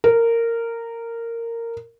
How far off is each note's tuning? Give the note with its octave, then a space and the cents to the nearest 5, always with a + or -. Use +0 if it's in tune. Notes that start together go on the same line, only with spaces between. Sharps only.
A#4 -15